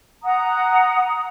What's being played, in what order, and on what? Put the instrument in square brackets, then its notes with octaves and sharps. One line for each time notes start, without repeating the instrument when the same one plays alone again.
[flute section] F#5 A#5 D#6